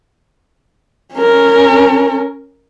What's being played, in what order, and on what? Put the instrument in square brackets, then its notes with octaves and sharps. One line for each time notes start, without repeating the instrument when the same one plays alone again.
[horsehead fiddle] C#4 A#4